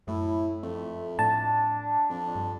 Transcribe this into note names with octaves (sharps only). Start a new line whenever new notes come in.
F#2 A2 E4
F2 A3
A2 D4 A5
F2
G2